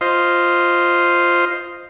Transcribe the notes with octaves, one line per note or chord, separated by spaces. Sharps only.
F4 C5 D#5 C6